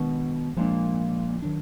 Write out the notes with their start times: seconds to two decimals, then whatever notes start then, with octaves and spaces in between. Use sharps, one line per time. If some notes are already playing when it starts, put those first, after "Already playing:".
Already playing: B2 D#3 G#3 D4
0.57 A#2 F3 G#3 D4
1.42 D#3 F#3 D4